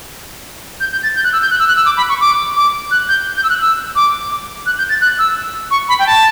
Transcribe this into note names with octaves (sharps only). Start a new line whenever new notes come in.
G6
G6
A6
G6
F#6
E6
G6
F#6
E6
F#6
E6
D6
B5
C#6
D6
D6
F#6
G6
G6
E6
F#6
E6
D6
D6
F#6
G6
A6
F#6
E6
C#6
B5
G5
A5